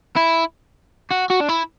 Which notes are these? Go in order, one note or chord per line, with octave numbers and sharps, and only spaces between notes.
E4
F#4
F#4
D4
E4